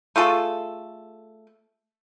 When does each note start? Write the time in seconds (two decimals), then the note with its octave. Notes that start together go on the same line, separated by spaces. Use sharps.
0.16 A3 F4 G#4 A4